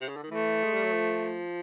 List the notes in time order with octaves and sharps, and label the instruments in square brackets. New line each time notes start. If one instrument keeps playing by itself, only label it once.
[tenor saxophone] C3
C#3
D3
D#3
[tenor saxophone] E3 [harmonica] A3
[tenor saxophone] G#3
G3
F#3
F3